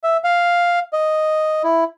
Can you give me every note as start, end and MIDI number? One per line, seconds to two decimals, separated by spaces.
0.04 0.17 76
0.24 0.79 77
0.93 1.63 75
1.64 1.84 64